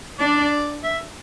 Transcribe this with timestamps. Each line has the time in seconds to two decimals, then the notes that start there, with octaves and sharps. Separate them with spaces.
0.19 D4 D5
0.83 E5